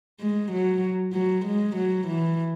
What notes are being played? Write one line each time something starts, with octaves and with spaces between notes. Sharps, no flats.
G#3
F#3
F#3
G#3
F#3
E3